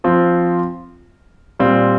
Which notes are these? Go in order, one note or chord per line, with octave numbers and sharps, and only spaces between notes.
F3 C4 F4
A#2 G3 C4 F4